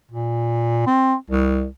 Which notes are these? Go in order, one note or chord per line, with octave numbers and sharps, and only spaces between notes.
A#2
C4
C2